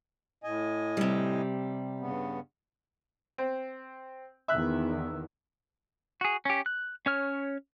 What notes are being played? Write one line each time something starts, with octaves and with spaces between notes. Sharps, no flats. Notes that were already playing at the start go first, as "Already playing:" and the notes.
A2 D#5 G#5
C3 G3
G2 C#3 B3
C4
E2 D#3 E5 F#6
F#4 G#4
C#4 G4
F#6
C#4 C#5 F6